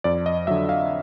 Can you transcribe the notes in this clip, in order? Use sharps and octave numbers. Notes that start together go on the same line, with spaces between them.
F2 D5
D#5
D3 F#3 E5
F5